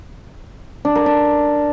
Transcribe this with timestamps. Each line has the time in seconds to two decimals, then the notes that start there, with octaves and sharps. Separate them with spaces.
0.85 D4
0.95 A#4
1.06 D4